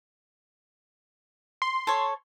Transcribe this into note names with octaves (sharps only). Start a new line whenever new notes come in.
C6
A4 C#5